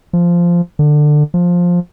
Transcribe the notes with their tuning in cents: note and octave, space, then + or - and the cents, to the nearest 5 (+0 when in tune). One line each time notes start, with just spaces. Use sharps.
F3 -10
D3 +20
F3 +10